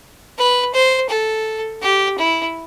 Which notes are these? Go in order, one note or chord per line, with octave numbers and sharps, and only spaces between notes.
B4
C5
A4
G4
E4